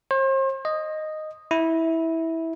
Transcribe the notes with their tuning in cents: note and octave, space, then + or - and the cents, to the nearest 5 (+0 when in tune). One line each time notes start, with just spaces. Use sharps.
C5 +40
D#5 -5
E4 -15